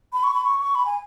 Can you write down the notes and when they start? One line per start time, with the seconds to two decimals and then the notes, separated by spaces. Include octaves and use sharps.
0.13 B5
0.23 C#6
0.34 B5
0.44 C#6
0.60 C#6
0.75 B5
0.86 G#5